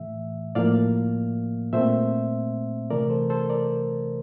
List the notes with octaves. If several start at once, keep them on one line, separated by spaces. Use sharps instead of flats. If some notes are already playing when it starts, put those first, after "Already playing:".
Already playing: A2 E3 A3 E5
A2 F3 A#3 D5 F5
A#2 A3 C4 C5 E5
C3 E3 A3 A#4 D5
A4 C5
A4 C5
A#4 D5